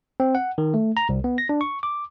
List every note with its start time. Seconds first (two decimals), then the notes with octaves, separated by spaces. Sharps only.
0.20 C4
0.35 F#5
0.58 D#3
0.74 A3
0.97 A#5
1.09 C2
1.24 B3
1.38 A#6
1.49 D4
1.61 C#6
1.83 D6